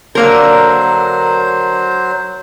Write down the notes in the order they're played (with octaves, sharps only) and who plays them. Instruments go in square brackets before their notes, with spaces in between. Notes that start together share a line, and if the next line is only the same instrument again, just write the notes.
[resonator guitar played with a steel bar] D3 A#3 A#4 [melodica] F#3 C5